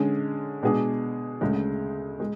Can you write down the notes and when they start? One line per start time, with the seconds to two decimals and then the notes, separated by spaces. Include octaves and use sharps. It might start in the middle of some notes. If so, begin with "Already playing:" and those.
Already playing: D3 G#3 C#4 G#4
0.63 B2 G#3 D4 G#4
1.41 D2 C#3 G#3
2.20 G#3